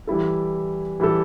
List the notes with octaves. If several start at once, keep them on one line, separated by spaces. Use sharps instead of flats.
E3 G3 E4 A4
E3 G3 E4 A4